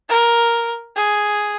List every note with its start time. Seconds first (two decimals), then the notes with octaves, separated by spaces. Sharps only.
0.09 A#4
0.96 G#4